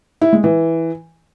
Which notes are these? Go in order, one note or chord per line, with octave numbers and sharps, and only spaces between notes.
E4
G#3
E3